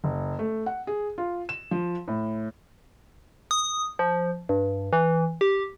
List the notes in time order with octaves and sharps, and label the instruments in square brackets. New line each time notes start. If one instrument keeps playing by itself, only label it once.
[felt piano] F#1
A3
F#5
G#4
F4
E7
F3
A2
[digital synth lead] D#6
F3
G2
E3
G4